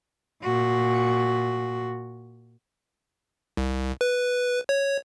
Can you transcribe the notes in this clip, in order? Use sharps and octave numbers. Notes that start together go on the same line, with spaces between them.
A#2 F#4
C2
B4
C#5